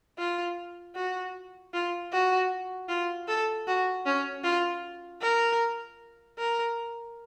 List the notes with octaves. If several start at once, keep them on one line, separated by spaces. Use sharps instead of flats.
F4
F#4
F4
F#4
F4
A4
F#4
C#4
F4
A#4
A#4